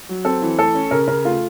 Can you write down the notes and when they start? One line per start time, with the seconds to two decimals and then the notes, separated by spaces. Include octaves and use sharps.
0.09 F#3
0.25 C4 A4
0.42 E3
0.58 A3 A4
0.75 C#4
0.91 C#3 A#4
1.08 C#3 A#4
1.24 A3 F4